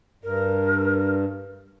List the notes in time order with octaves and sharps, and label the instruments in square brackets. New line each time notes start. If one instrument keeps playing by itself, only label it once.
[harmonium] G2 [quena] A#4